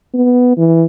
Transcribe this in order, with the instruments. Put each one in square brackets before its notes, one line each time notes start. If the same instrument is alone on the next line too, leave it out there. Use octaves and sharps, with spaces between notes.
[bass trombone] B3
E3